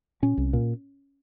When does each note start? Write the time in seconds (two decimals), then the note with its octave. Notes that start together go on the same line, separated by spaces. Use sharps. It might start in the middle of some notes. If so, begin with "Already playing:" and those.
0.22 A#2 C#4
0.37 C2
0.53 A#2